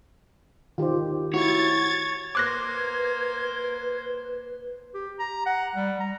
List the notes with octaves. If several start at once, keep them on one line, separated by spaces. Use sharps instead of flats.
D#3 F4 G4 C5
E4 F#4 C#5 G#6 A6
A#3 B4 C5 D6 F#6 G#6 A#6
G4
A#5
F#5
G3
A#5